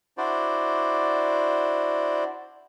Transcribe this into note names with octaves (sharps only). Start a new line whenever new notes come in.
D4 E4 F#4 C5 D5